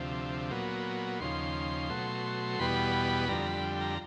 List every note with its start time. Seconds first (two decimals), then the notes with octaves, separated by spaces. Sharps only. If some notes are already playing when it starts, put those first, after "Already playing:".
Already playing: D2 C3 F3
0.51 A#2 F#3 B3
1.20 D#2 C#3 F3 C6
1.90 B2 F#3 A3
2.59 E2 B2 G3 B3 B5
3.28 F2 D3 G3 A#5
3.46 B5
3.81 A#5